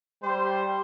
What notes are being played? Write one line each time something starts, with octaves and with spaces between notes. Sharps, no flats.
G3 C5 C6